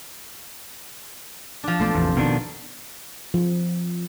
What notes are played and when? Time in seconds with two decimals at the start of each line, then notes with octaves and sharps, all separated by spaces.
1.64 F3 D4
1.80 B1 A3 B3 A4 C5 D5
1.95 A1 E2 C3
2.17 B2 D#3 D4
3.34 F3